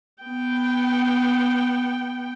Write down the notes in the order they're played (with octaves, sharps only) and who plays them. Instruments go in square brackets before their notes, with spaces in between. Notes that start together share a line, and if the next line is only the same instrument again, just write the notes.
[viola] B3 G5